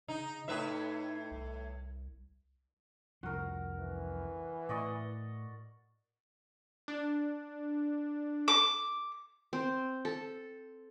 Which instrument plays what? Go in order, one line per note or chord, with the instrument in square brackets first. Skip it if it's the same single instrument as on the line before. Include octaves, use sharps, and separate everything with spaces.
[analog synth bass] C#3 [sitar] D#4
[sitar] A2 B4 E5 [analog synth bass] D#4
[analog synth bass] C2
[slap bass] C2 F2 F3 [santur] F#4 A#4
[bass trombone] E3
[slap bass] A2 [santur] D5 D#5 C#6
[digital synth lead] D4
[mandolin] D6
[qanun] C4
A4